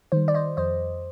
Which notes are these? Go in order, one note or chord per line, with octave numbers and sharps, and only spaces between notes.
D#3 G3 C5
D5
C5 D#5
F2 C5 D#5